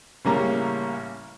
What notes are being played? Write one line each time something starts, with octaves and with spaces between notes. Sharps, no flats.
A1 C#3 G3 A#3 C#4 A#5